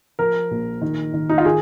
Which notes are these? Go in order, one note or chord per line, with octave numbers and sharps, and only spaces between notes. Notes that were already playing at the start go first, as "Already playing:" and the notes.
F3 A#4
A#1
D#3
D#3
D#4
F4
D#3 G#4